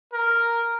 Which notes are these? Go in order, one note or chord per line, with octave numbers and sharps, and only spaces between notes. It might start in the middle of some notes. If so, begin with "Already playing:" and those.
A#4